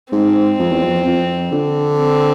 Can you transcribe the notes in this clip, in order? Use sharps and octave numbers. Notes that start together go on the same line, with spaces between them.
G#2 C4
F2
E2
F2
F2
D3
C4